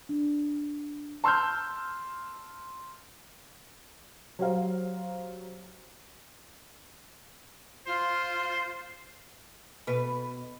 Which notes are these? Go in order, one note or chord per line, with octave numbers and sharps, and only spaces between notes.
D4
A5 C6 E6 F6 G6
F#3 G4 C5 F5 A#5
F4 C5
B2 B4